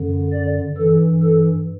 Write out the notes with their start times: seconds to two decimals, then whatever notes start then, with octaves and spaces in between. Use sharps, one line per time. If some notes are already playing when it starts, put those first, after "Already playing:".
Already playing: F#2 D3
0.32 D5
0.77 G2 E3 A4
1.23 A4